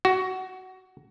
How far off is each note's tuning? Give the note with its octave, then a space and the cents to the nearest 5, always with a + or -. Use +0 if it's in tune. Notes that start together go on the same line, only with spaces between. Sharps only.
F#4 +15